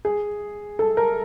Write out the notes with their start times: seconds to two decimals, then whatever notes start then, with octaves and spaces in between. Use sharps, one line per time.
0.05 G#4
0.79 A4
0.97 A#4